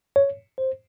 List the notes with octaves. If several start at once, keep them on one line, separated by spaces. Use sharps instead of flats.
C#5
C5